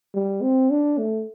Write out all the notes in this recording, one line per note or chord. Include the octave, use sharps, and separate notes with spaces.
G3
C4
D4
A3